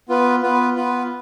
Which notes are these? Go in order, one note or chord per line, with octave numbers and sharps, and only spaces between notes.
B3 F4 B4
B3 F4 B4
B3 F4 B4